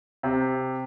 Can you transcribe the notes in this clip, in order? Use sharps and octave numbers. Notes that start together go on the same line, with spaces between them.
C3